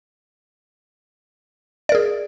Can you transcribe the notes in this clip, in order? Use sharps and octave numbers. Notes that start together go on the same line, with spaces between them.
G#4 A#4 D5